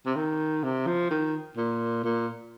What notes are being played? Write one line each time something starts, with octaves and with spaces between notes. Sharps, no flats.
C3
D#3
C3
F3
D#3
A#2
A#2